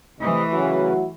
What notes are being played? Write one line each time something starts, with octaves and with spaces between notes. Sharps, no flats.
C3 E3 A3 D#5
C#3 F#3 C#4 E4 F#4 B4